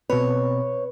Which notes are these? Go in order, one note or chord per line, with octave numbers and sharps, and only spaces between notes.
B2 C4 B4 C#5